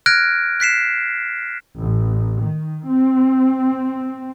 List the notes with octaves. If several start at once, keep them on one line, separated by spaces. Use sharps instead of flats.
F6 F#6 G#6 A#6 D7
F#6 B6 C7 E7
A1
D#3
C4